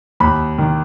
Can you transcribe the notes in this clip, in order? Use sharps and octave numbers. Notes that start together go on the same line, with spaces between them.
D#2 B5
D#3